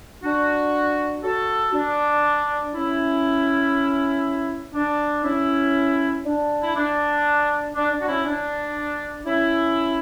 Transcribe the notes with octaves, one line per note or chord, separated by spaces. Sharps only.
D4 F#4
F#4 A4
D4
C#4 E4
D4
C#4 E4
D4
E4
D4
D4
D4
F#4
C#4 E4
D4
C#4 E4